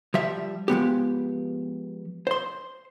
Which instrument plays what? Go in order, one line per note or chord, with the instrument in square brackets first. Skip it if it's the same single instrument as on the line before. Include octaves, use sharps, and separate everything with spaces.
[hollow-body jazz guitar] F3 G3 E5
F3 G#3 B3 G4
C5 C6